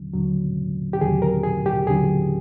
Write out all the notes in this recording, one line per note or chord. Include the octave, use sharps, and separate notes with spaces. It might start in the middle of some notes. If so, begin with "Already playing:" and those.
Already playing: D#2 D3 F#3
D#2 D3 F#3
G4
D#2 D3 F#3 G#4
A#4
G#4
G4
D#2 D3 F#3 G#4